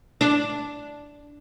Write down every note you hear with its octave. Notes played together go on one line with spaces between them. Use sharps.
D4